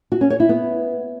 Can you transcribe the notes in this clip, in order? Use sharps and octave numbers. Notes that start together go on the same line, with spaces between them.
F#4
C#4
C#5
E4
B3